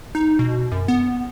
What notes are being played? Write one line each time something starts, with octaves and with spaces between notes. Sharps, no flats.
D#4
B2
F#2
B3